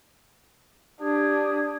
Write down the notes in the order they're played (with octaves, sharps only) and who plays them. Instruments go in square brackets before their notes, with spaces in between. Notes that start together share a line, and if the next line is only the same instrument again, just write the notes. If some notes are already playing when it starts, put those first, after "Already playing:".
[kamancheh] D4 [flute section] G4 D#6 G#6